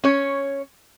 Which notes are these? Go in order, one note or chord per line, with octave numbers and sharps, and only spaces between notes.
C#4 C#5